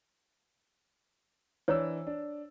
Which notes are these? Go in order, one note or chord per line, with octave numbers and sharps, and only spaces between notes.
E3 D4 C5 C#5 A#5 E6
D4